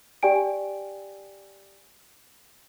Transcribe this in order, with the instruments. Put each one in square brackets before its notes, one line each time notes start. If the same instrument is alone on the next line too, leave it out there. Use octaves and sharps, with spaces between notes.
[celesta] G4 D5 G5 G#5 D7